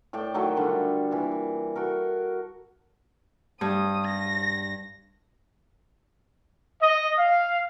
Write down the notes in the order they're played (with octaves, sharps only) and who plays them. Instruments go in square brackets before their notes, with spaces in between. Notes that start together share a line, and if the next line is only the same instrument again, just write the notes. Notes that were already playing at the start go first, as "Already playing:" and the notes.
[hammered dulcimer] A2 D5 G5 A5
D#3 F#3 A3 A4
D3 G3 F4 A4
A#2 E3
C#6
F#4 A4 A#4
[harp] G2 [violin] D#6
[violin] A#6
[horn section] D#5
F5